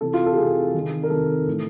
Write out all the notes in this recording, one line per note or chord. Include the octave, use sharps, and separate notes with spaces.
C3 E3 A4
F4
A4
G4
C3 E3 G#4
C3 D#3
A#4
C3 D#3 A4
A2 E3